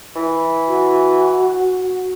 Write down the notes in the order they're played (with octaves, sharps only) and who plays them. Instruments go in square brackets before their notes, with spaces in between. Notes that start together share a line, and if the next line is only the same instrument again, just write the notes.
[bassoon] E3
[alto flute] F#4